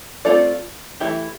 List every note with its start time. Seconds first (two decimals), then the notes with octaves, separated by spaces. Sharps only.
0.25 A3 C4 F4 A4 D5
1.00 E3 A3 E4 G4